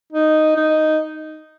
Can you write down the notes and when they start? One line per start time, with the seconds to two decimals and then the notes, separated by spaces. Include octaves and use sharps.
0.13 D#4
0.56 D#4